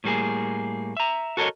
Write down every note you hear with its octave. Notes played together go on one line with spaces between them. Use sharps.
A2 G3 A#3 G#4
E5 A#5
F#4 A4 A#4 C5 C#5 D#5